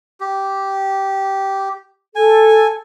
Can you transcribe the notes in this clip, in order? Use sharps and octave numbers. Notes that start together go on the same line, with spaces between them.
G4
A4 G#5